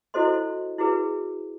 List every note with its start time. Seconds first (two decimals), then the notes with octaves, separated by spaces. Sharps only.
0.14 E4 F#4 A4 C5 D#5 C6
0.78 E4 F#4 G#4 B4